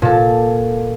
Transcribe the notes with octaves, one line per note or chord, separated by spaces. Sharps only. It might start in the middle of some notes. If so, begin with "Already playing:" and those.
A#2 A4